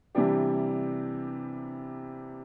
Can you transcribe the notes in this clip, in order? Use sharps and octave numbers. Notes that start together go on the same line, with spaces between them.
C3 E3 G3 D4 G4